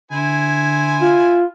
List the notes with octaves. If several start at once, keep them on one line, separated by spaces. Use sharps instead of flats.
D3 E4 C5 G#5
F4